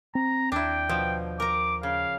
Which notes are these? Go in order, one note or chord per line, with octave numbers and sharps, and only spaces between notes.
C4 A#5
D#2 D4 E4 G5
B2 F3
A#4 A#5 D6
C#3 F5